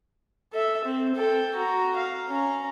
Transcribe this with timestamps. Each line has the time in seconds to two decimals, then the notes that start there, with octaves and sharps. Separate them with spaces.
0.53 A4 E5
0.84 C4
1.15 A4 G5
1.55 F#4 A#5
1.96 F5
2.29 C#4 A#5